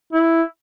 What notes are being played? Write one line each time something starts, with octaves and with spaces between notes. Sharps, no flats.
E4